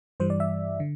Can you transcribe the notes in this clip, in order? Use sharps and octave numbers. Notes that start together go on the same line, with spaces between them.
G2 E3 G3 C5
D5
E5
D3